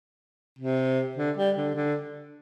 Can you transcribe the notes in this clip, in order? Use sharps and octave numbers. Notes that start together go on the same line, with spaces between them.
C3
D3
G3
D3
D3